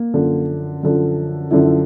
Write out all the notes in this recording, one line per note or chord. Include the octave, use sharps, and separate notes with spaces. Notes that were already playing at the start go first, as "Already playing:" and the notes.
Already playing: A#3
F#2 D3 F3
F#2 D3 F3
F#2 D3 F3 E4
E4